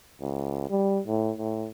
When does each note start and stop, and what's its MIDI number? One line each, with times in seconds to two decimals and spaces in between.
0.21 0.66 37
0.70 1.00 55
1.06 1.32 45
1.37 1.69 45